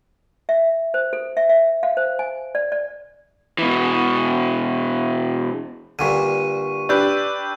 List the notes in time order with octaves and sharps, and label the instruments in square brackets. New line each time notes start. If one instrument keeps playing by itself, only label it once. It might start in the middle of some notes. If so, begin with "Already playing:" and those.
[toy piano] E5
C5
A4
E5
E5
F5
C5
G#5
D5
D5
[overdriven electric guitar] B2 E3
[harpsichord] G2 A#2 D3 [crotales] C#6 D#7
[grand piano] D4 G4 B4 [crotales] E6 G6